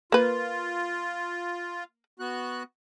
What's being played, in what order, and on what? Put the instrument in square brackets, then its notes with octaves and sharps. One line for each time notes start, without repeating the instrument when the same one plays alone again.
[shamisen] A#3 B4 [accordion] F4
[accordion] B3 F#4 F#6